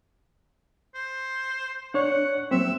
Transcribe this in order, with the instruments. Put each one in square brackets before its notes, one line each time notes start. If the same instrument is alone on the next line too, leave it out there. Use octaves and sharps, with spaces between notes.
[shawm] C5
[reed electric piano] D4 C#5 [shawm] F#5
[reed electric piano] F#3 A#3 C4 [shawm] E5